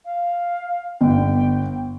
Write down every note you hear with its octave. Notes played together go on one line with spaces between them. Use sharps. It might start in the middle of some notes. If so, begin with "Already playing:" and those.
F5
G1 B3 G5